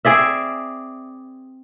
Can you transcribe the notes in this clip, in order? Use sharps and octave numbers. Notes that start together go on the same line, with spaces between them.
C4 G#4 D5 E5